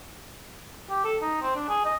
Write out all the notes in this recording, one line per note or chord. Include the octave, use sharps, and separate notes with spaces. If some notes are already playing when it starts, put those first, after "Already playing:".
G4
A4
D#4
C4
D4
G#4
D#5